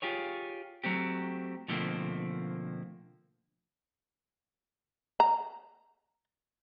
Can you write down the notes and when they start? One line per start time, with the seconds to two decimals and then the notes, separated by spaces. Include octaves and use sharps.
0.02 F4 G4 G#4 C#5
0.84 F#3 A3 C4 G4
1.68 B2 D3 F3 A3 A#3 C4
5.20 A#5